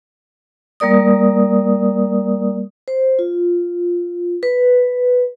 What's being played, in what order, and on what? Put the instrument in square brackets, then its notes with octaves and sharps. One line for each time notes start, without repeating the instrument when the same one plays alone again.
[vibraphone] G3 A#3 A#4 D5 D#6
C5
F4
B4